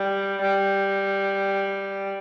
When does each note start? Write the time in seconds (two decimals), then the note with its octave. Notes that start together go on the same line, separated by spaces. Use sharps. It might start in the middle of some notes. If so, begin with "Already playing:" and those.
Already playing: G3
0.41 G3